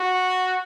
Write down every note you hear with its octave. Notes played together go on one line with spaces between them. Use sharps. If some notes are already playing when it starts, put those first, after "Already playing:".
Already playing: F#4